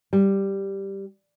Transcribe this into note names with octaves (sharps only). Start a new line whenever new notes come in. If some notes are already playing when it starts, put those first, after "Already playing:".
G3